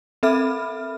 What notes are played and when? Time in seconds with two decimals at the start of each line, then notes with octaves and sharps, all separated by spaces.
0.23 C4 A4 E5 B5 F6